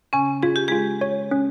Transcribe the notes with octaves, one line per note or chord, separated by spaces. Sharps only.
C#3 C#4 G#5
F4 G#4
G4
G#3 F4 G#4
C#5
C#4